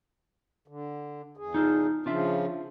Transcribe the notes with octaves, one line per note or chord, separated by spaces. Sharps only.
D3
E2 G#4
D#4 F4 A4
C#3 F3 D4 F4 E5